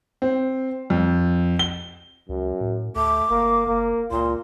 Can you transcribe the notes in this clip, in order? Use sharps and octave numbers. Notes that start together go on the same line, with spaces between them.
C4
F2
G7
C#2 F#2
A2
D2 A3 D6
G1 A#3
F#1 A#3
C#2 A#2 C6